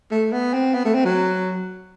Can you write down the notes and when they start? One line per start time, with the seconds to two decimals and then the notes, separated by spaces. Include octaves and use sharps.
0.11 A3
0.32 B3
0.53 C4
0.74 B3
0.85 A3
0.94 C4
1.05 F#3